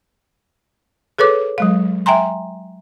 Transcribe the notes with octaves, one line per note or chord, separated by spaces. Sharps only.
G#4 A4 B4 C#5 D6
F#3 G#3 F5
E5 G5 G#5 A#5 C6